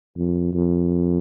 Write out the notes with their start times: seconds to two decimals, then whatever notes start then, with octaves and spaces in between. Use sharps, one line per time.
0.17 F2
0.53 F2